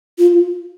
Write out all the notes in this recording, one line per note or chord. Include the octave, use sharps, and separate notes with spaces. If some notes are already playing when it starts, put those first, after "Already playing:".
F4